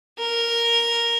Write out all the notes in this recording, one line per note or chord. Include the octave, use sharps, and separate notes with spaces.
A#4